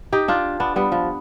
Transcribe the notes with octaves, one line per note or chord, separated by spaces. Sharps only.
D#4 G4
D4 F4
B3 D4
G3 B3
F3